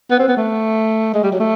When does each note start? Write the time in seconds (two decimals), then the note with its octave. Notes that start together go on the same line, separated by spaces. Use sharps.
0.11 B3
0.19 C4
0.28 B3
0.37 A3
1.14 G#3
1.24 G3
1.32 F#3
1.40 A3